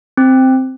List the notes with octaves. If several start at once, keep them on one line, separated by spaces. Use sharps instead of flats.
C4